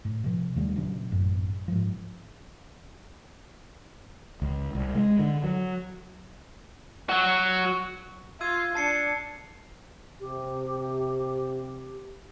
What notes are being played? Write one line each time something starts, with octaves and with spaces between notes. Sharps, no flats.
A2
C3 F3
D#2 D#3 G3 A3
A#2 C#3 F#3 D4
A1 F#2
G#2 F3
C#2
C2
G#3
D3
F#3
F#3 F#4 C#6
F4 E6 G#6 D#7
D4 A5 C7 C#7
C3 G4